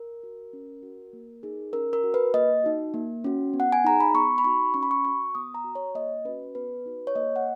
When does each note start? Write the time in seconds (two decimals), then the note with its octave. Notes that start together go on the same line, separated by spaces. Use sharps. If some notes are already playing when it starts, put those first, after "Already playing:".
Already playing: A#4
0.23 F#4
0.53 C#4
0.83 F#4
1.13 A#3
1.43 D#4 G#4
1.73 C#4 A#4
1.93 A#4
2.04 F#4
2.14 B4
2.34 A#3 D#5
2.64 D#4 F#4
2.94 A#3
3.24 C#4 F#4
3.53 B3
3.60 F#5
3.72 G#5
3.84 D#4 G#4 A#5
4.00 B5
4.14 B3 C#6
4.38 B5
4.44 D#4 F#4 C#6
4.74 C#4 C#6
4.83 B5
4.91 C#6
5.05 F#4 C#6
5.35 B3 D#6
5.54 A#5
5.64 F#4
5.75 C#5
5.95 A#3 D#5
6.25 C#4 F#4 B4
6.55 B3 B4
6.86 D#4 F#4
7.07 C#5
7.15 A#3 D#5
7.36 F#5